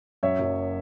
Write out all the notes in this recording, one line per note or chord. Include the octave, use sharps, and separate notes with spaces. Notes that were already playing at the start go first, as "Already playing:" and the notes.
F#2 C#5 E5
F#1